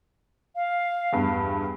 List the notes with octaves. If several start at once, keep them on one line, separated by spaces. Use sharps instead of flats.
F5
E2 G2